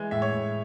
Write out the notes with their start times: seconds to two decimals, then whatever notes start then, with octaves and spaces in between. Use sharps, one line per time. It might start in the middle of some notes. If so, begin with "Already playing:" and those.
Already playing: E3 G#3
0.11 A2 E5
0.22 C#5
0.32 A2